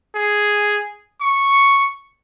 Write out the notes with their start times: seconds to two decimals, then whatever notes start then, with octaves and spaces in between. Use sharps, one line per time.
0.15 G#4
1.21 C#6